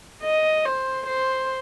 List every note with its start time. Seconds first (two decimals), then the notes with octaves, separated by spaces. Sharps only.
0.23 D#5
0.65 C5
1.07 C5